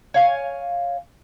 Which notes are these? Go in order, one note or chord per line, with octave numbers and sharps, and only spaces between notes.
C#5 F5 G#5